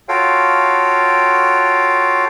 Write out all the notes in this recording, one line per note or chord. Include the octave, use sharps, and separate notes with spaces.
F4 F#4 A4 C#5 F5 G5